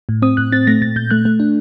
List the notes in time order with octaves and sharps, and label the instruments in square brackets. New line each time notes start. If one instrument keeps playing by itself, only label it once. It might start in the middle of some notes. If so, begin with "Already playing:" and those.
[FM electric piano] A2
C4 D#6
A2 F#6
C4 A6
A3 A#6
A#2 A6
A#2 G6
A3 F#6
A3
D4